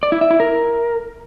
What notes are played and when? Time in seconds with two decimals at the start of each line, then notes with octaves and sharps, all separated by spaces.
0.03 D5
0.12 E4
0.21 E5
0.31 E4
0.40 A#4